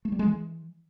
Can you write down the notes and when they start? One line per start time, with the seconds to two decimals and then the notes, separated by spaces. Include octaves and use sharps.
0.05 A3
0.12 G3
0.19 G#3
0.26 E3